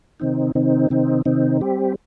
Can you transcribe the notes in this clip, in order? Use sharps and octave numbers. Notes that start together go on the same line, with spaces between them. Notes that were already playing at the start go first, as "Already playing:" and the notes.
C3 D#3 C4 D#4
C3 D#3 C4 D#4
C3 D#3 C4 D#4
C3 D#3 C4 D#4
G3 C4 G4